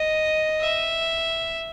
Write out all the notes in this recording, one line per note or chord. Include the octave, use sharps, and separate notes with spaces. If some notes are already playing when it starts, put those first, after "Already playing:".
Already playing: D#5
E5